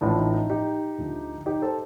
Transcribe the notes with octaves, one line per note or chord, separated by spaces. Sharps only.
A1 A2 F3 D4
D#4
D#4
D#4 G4
D2 D3 F3
D#4 G4
A4 C5